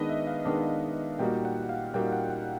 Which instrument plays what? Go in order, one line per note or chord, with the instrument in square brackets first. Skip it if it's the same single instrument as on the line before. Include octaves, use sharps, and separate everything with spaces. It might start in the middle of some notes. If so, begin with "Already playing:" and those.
Already playing: [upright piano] D#3 G#3 B3 D4 [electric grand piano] B4 D#5
[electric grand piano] E5
F5
[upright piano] D#3 G#3 B3 D4
[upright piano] A#2 G3 A#3 D#4 F#4 [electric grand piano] G5
[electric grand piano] F#5
F5
[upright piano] A#2 G3 A#3 D#4 F#4 [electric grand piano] G5
[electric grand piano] F#5
F#5